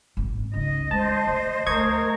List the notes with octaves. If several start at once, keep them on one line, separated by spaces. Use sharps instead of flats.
G#1 A#2
C#2 D#4 D#5
G#3 C5 A5
D2
D2 A3 A#4 D#5 C#6 G#6